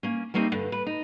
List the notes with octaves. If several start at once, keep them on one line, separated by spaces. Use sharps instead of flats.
A#3 C#4
G3 A3 A#3 C4 D#4
G2 D3
B4
D#4